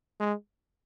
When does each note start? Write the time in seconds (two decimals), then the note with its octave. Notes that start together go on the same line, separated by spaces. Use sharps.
0.20 G#3